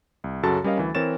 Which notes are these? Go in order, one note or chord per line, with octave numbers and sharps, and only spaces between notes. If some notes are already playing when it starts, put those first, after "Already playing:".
C2
F#2 C#3 F#4 A4 A5 A6
G3 C#4 A#4 D#5 F5
D2 E3
E3 C4 A#4 C#5 A6 E7